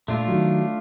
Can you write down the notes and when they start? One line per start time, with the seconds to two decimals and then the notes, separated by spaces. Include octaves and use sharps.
0.08 A#2 A3 D4 F4
0.28 D#3 F#3